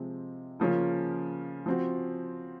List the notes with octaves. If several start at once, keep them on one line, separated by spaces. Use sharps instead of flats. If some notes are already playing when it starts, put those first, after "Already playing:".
Already playing: C3 F3 G#3 C4
C#3 F3 A#3 C#4 F4
F3 C4 F#4